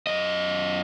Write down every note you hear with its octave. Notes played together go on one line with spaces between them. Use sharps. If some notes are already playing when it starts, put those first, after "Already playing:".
F#2 D#5